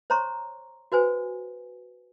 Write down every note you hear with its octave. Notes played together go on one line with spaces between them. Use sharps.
C5 C#5 A#5 C6 C#6
F#4 B4 C5 G#5